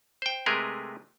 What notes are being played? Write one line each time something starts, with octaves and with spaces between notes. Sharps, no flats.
C5 G5
C3 G#3 A3 G#4 A#4 B4